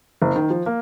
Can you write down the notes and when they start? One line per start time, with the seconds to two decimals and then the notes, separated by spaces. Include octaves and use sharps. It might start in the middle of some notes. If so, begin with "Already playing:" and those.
0.22 F#1
0.36 D#3
0.50 F3
0.66 A#3